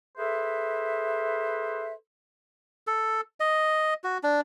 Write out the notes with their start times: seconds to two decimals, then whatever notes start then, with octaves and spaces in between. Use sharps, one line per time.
0.17 G#4 A4 B4 C5 E5
2.87 A4
3.40 D#5
4.04 F#4
4.23 D4